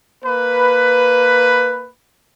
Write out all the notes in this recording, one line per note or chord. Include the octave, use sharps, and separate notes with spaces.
A#3 B4